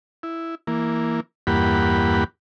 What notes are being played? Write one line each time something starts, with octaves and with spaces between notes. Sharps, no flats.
E4
E3 A#3
E2 G2 A#3 G4 F#5 B5